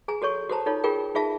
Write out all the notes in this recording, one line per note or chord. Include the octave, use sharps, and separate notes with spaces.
G#4 G#5 A#5
F#4 A4 C#5 C#6
F#4 A4 C5 A5 A#5
D#4 F4 A4 C#5
F4 G#4 A#4 G5
D#4 F4 G#4 E5 F5 A5